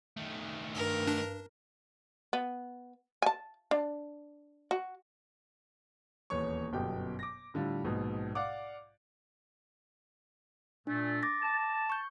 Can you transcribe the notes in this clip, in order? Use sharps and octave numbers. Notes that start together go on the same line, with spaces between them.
D#3 A3
G2 A#4
D4
B3
G#5 A5
D4
F#4
D#1 E2 B3 C#5 C#6
G1 F#2 B2 G4 G5
D6 A#6
A2 D3 G3 F4
A#1 G#2 B2
D5 F5 F#5 D6
A#2 A3 D4
D6 A6 A#6
A5
C#6 G6